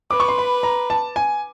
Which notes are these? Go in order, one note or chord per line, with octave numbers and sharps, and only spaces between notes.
B4 D6
C#6
C6
B5
A#5
A5
G#5